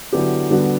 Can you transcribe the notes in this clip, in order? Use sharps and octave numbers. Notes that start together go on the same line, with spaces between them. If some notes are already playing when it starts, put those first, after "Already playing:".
D3 F#3 B3 E4 G4
D3 G3 B3 D4 F#4